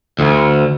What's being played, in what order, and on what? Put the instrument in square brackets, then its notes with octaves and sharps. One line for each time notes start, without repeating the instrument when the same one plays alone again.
[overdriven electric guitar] D2